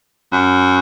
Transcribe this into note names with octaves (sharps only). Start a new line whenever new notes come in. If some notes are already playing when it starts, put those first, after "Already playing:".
F#2